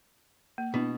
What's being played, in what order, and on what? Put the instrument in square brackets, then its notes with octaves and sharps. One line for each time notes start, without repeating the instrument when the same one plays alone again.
[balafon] A#3
[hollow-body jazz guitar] B2 [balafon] D4 E4